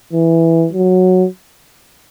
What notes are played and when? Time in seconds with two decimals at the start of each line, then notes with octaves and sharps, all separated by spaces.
0.13 E3
0.73 F#3